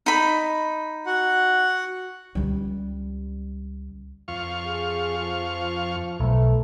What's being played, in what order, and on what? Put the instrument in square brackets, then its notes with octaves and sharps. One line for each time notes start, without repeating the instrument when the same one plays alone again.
[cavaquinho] D#4 B5
[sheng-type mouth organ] F#4 F#5
[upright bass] C#2 G3
[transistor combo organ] F2 F5 C#6
[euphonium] G#4
F3
[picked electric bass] B1 [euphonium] A3